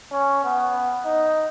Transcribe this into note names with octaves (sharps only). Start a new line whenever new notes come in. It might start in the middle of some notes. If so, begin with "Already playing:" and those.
C#4
B3
D#4